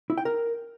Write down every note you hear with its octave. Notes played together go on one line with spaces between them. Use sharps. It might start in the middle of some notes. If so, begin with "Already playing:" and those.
E4
G5
A#4